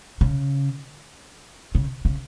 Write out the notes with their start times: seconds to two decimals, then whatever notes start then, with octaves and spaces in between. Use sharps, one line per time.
0.21 C#3
1.75 C#3
2.05 C#3